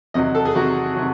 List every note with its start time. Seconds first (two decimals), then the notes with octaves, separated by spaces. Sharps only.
0.14 E2 C3 D#3 F#3 D#5
0.35 A4
0.45 G#4
0.54 E2 C3 D#3 F#3 F#4
0.95 C3 D#3 F#3